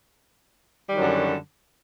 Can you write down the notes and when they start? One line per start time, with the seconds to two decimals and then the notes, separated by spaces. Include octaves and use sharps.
0.89 G3
0.92 D#3
0.95 F#3
0.98 F#2
1.01 D3